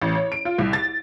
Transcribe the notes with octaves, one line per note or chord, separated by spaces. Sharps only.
A1
C#5
D7
F4
C2
A6